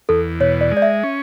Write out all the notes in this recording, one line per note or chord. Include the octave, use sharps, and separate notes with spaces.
E2 A4
B2 C#5
D5
G#3
D5
E5
C#4